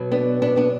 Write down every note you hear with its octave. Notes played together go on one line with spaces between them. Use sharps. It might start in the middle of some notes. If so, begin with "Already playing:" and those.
Already playing: B2 F#3
B3 D4
B3 D4
B3 D4